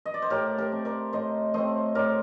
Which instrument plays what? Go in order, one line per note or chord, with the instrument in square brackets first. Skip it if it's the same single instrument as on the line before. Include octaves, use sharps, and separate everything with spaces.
[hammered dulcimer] D#5
D5
C5
A2 G4 A#4
G4 A#4
A3 C4
A#4 D5
A2 C5 D#5
A3 C4 C5 D#5
A2 A#4 D5